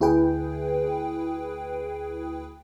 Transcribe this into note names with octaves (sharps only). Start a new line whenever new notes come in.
D2 E4 G#4 B4 G5